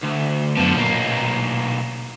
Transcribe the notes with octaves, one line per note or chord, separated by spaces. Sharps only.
D2
F#2 D3 F3 B3
B1 A#2 A#3